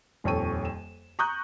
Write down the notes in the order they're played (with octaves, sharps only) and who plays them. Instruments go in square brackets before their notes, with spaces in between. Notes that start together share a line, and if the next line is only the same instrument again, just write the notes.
[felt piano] D#1 F2 A4 C#5 C#6 D#7
E7
A#5 C#6 D#6 F#6 G6